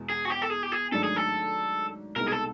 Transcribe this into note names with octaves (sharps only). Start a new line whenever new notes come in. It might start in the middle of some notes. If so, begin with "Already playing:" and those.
Already playing: E2 B2 G#3 B3
G#4
F#4
G4
A4
G#4
G4
G#4
G#2 D#3 F#3 A3 D4 A4
G#4
A4
C2 B2 G#3 B3 D#4 A#4
G#4
A4